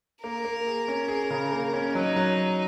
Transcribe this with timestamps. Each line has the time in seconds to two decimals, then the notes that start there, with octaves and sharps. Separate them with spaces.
0.23 A#3 A#4
0.45 A#3
0.67 G#4
0.88 C#4
1.08 G#4
1.30 C#3
1.52 A#3
1.73 C#4
1.95 F#3 D#4
2.16 F#3